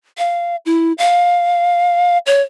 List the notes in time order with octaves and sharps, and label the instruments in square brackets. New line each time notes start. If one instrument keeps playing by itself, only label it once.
[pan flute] F5
E4
F5
C#5